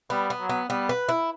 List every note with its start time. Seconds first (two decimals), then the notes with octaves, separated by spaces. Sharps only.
0.10 G3 B3
0.30 B3
0.40 F#3
0.49 B3
0.69 G3 B3
0.89 B4
1.09 E4